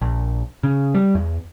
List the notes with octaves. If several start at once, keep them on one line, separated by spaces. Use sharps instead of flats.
A#1
C#3
G3
E2